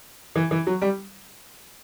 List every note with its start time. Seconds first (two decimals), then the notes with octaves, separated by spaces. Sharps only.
0.36 E3
0.51 E3
0.67 F#3
0.81 G3